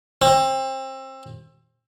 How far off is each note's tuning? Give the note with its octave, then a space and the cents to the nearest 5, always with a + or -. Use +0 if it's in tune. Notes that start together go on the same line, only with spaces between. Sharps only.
C4 +30